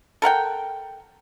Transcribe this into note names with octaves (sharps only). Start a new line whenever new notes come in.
A4 A#4 F#5 G5